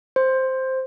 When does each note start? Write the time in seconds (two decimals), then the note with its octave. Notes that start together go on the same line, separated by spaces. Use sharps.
0.16 C5